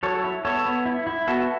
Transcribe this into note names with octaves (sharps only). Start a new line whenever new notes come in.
F#3 A4 C#5
E4
B3 A4 C#5
B3
E4
E4
B3 F#4 A4